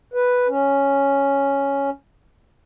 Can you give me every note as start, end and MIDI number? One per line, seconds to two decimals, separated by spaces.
0.14 0.48 71
0.49 1.90 61